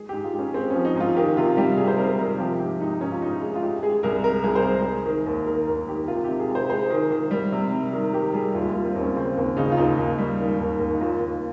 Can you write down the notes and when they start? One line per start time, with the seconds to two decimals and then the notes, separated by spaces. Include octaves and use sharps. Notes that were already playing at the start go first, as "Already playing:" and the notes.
Already playing: G#3 G#4
0.09 G#2 G4
0.24 F4
0.33 G#2
0.39 C#4
0.54 G#3 C4
0.70 F3 C#4
0.85 D#4
0.95 G#2 F4
1.17 D#3 G4
1.37 C3 F4
1.57 G3 G4
1.77 C3 G#4
1.87 C5
1.98 G3 A#4
2.19 C3 A#4
2.39 F3 G4
2.60 G#2 G4
2.81 G#2 D#4
3.01 G#2 C#4
3.12 F4
3.22 G#2 D#4
3.41 G#3
3.56 F4
3.62 G#3 G4
3.83 G#3 G#4
4.03 C2 A#4
4.24 G#3 A#4
4.44 C2 G#4
4.55 C5
4.64 C2 A#4
4.85 G#3
5.06 D#3
5.26 D#2
5.46 D#3 A#4
5.67 D#2 A#4
5.88 D#3 G4
6.08 C3 F4
6.24 C3 G4
6.40 G#4
6.50 G#3
6.55 C5
6.70 G#3 C5
6.90 D#3
7.11 D#3
7.31 G3
7.52 C3
7.72 G3
7.93 D#3 A#4
8.13 D#3 G4
8.33 G3 G#4
8.54 D#2 F4
8.70 F4
8.75 G3
8.85 C4
8.95 D#2
9.00 C#4
9.15 C#3 C4
9.37 D#2
9.57 C#3 D#4
9.72 F4
9.77 D#2 D#4
9.97 D#2
10.18 G3
10.38 D#3
10.60 D#2
10.80 D#2
10.93 D#4
11.01 D#2 F4
11.21 D#2